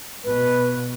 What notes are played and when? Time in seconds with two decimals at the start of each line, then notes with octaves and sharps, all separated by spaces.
0.24 B2 B4